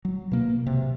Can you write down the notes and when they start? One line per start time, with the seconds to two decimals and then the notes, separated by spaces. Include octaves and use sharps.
0.05 F#3
0.32 B2 A#3
0.66 C3